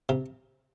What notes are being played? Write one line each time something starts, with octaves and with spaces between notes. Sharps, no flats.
C3